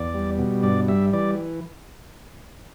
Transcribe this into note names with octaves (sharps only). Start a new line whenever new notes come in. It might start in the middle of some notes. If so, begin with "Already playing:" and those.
Already playing: E2 D5
G3
B2
G2 D5
G3 E5
E3 D5